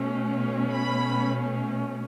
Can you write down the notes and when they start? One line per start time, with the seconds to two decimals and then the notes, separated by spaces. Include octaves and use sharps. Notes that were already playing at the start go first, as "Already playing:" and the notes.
Already playing: B2 A3 C#4
0.71 B5